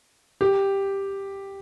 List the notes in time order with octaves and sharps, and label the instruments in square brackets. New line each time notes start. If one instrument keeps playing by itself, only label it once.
[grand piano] G4